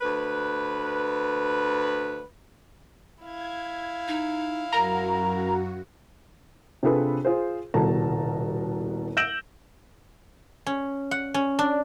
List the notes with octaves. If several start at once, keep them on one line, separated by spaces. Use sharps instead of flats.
D2 B4
E4 F5 G#6
D#4
F#2 F#4 A#4 A#5
C3 D4 F4 G#4 A4 B4
F4 G#4 C5
D#1 C2 B2 A4 A5 A#5
E6 G6 A#6 D7 E7 F#7
C#4
F#5
C#4
D4